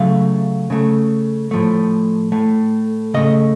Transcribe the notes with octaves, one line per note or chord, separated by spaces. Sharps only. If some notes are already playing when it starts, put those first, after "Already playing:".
Already playing: C#3 F#3 A3 F5
C#3 A3
A2 F3 A3
A2 A3
C#3 A3 D#5